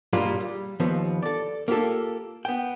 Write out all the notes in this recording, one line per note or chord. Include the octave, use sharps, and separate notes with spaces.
G2 A#2 G3 G#3 F4
G3
D#2 F3 B3 B4
A4 D5
A#3 F4 G4 A4
B3 G5